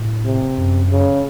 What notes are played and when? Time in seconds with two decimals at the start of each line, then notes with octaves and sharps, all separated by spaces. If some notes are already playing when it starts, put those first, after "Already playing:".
Already playing: A2
0.25 C3
0.58 F#2
0.90 C#3